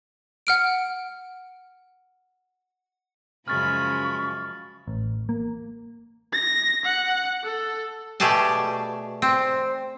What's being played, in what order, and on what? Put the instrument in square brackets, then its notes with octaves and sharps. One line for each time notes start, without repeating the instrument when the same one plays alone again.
[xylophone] F#5 F6 D7
[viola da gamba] F#2 C#3 F3 [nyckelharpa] G#3 B5 [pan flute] C#6 [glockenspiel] F6 A6
[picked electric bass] A1
A#3
[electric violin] A#6
F#5
A4
[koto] B2 A3 G4 G#4 D5 A5
C4